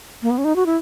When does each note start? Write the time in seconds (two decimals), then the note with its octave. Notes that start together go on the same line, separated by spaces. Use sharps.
0.22 A#3
0.31 B3
0.38 C#4
0.45 D#4
0.56 F#4
0.66 E4